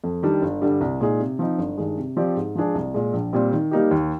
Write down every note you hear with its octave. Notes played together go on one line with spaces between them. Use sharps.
F2
D#3 G3 D4
G1
G2 D3 G3
C2
A#2 G#3 D#4 G#4
C3
F3 C4 D#4
G1
G2 D#3 G#3
C3
F3 C4 G4 D5
G#2
F3 G#3 D4 G#4
C2
A#2 G#3
A#1
A#2 G3 C4
D#3
G3 A#3 D#4 G4
D#2